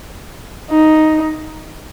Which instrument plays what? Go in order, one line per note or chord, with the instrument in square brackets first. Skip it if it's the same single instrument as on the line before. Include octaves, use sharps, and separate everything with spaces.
[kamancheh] D#4